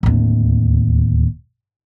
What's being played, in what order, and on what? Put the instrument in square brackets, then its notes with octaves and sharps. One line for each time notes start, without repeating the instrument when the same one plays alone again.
[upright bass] D1 D#2